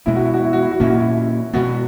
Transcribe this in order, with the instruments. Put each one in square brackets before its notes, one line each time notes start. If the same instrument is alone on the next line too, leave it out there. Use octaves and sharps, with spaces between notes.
[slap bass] B2 G#3 B3 [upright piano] E4
[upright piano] F#4
E4
F#4
E4
F#4
E4
F#4
[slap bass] A#2 A#3 C#4 [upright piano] E4
[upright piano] F#4
E4
[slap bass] B2 G#3 B3 [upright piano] F#4